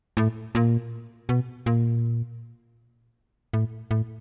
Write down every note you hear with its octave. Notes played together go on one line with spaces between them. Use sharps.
A2
A#2
B2
A#2
A2
A2